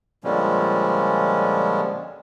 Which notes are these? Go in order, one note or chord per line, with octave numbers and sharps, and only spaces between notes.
A#2 D3 F3 G3 G#3 C#4